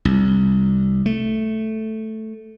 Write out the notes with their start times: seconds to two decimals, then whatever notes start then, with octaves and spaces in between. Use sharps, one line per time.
0.05 C2
1.06 A3